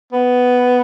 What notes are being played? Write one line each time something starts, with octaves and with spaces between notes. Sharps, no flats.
B3